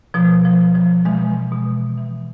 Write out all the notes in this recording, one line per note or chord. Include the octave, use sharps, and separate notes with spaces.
B2 F3
F3
B2
F3
B2 E3 G#3
B2
E3